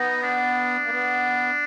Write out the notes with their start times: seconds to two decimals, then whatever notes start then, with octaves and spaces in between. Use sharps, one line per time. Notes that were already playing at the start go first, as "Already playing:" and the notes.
Already playing: B3 D#4
0.22 D4
0.85 A#3
0.90 B3